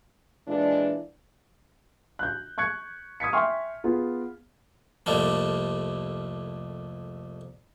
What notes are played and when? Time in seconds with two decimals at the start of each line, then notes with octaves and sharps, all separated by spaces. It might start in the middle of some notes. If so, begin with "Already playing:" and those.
0.48 A#2 E3 G#3 D4
2.19 F#6 G6
2.58 C#6 F#6 G#6 C#7
3.20 D#6 G#6 B6 C#7
3.33 E5 G5 G#5 C6 C#6 F6
3.84 B3 F4 G#4
5.06 C2 F2 G3 A3 A#3